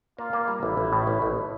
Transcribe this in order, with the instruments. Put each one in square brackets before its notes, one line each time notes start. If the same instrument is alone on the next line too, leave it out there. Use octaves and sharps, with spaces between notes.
[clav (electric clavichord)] A#3 [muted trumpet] F4
[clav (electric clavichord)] A#3
G3
[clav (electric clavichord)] A1 [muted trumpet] E4
[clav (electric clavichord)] A1
A2
A1
A1